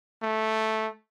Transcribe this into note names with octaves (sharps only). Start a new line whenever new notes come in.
A3